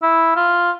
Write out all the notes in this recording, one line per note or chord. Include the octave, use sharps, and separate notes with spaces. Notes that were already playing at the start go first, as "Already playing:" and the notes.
E4
F4